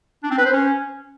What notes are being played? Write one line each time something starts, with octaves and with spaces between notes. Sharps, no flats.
D4
C4
B4
C5
C#4